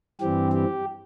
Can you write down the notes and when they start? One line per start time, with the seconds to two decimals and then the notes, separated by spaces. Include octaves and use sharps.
0.21 G2 E3 G3 C4 G4
0.52 G4